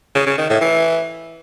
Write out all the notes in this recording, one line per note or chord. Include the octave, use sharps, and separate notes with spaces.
C#3
C#3
D#3
A2
E3